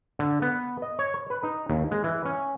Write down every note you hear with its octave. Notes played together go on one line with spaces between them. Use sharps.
D3
B3
D#5
C#5
C#5
B4
D#4
D#2
G#3
E3
C#4